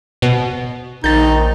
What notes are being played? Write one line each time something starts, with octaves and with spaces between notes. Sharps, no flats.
B2
A#1 D#3 D#4 G6 A6